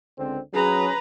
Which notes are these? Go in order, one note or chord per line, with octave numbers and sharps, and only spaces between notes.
C#2 D3 C4
F#3 C#4 G#4 B4 A#5